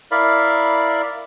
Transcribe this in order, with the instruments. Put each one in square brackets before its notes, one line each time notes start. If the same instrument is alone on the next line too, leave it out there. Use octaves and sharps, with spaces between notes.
[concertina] E4 A#4 D5 F5 B5